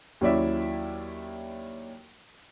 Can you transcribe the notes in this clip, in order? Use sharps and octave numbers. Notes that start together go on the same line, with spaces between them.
D#2 F#3 C#4 E4 D5 E5